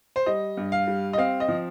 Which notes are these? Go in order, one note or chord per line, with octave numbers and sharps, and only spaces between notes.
C5
G3 D#5
G2
F5
G3
D#5
C4 F5
D#5
F3